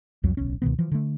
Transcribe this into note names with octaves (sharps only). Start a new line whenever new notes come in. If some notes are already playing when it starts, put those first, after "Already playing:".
C2 F2 F#3
D1 B1 C#4
C#2 B2 D#3 B3
E3 F3
D3 A3